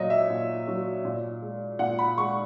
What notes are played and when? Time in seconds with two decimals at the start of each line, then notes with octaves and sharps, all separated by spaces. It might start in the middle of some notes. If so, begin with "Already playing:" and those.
Already playing: A#2 F#3 C#5 D#5
0.10 E5
0.30 A#2
0.68 F#3
1.05 A#2
1.42 G#3
1.79 A#2 F#5
1.99 B5
2.18 G#3 C#6